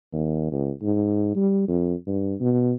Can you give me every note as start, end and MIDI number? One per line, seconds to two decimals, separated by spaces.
0.13 0.49 39
0.51 0.71 37
0.82 1.31 44
1.35 1.65 55
1.68 1.94 41
2.07 2.34 43
2.40 2.73 47